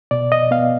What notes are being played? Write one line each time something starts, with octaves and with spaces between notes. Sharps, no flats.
B2 D5
D#5
B3 F5